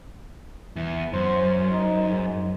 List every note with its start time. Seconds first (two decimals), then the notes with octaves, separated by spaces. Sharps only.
0.76 E2 E4
1.13 F#2 C5
1.72 D#4
2.10 G#2